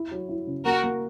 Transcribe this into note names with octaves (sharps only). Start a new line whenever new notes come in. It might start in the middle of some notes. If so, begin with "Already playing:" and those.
Already playing: E4
F#3
E4
C#3
A#3 F#4 A#4
A#3